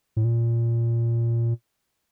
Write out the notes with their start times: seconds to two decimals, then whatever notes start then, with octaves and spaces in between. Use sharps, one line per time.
0.17 A2
0.24 A#2